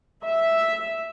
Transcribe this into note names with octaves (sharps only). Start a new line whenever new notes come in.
E5